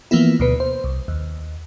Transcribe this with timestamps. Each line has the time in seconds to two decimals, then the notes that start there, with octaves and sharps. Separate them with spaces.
0.11 E3 F3 A#3 B3 E4
0.40 D2 B2 B4
0.60 C5
0.84 C2
1.08 D#2